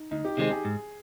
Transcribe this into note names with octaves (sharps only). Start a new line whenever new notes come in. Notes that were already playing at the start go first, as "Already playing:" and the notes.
Already playing: D#4
D2 D#4
G4
C3 D#3 G#3 C4 G4
G#4
G#2